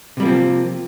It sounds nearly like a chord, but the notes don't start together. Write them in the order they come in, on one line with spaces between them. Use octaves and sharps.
C3 G3 A#3 F3 C4